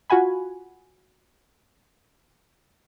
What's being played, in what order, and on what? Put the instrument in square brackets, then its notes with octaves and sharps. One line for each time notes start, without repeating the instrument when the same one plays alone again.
[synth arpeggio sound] F4 F#4 F#5 G#5 B5